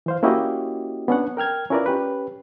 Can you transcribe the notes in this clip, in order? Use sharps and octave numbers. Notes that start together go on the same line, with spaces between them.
E3 C5 F5
A#3 C#4 E4 F#4 G4 D#5
B3 C#4 D4 F#5
A#4 G5 F6 G#6
C#4 E4 F4 A#4 B4 D5
C#4 G4 B4